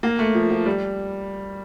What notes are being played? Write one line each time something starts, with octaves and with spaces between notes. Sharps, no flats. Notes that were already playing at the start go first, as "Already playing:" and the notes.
A#3
A3
F3
F3
G3